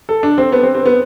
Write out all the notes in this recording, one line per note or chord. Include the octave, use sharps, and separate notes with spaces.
A4
D4
C4
B3
C4
C4
B3